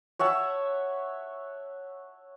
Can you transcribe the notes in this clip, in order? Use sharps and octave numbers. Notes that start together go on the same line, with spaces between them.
C#5 E5 F#5 A5